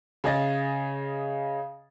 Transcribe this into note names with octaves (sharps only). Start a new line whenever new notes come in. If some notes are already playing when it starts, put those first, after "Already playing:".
C#3 G#4 D#5 A6